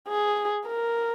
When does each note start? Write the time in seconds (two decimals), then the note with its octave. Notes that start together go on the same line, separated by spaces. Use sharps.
0.09 G#4
0.66 A#4